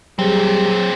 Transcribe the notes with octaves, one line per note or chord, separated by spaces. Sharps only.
A#2 F#3 G3 C4 G#4